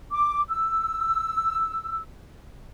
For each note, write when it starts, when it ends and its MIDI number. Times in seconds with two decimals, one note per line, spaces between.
0.11 0.41 86
0.49 2.00 88